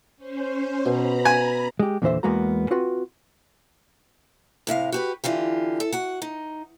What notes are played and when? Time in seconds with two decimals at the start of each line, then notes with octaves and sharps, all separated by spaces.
0.17 C#4 C5
0.86 B2 A#5 B5
1.25 G#5
1.80 G#3 G4
2.02 E2 A#2 D3 E3 C5 E5
2.23 E2 G#3 A#3 B3 F#4 A#5
2.71 C4 F4 F#4 B4
4.67 A2 C3 E5 F5
4.92 F#4 G4 B4
5.24 D3 E3 F4 G4
5.80 A4
5.92 F#4 F#5
6.22 D#4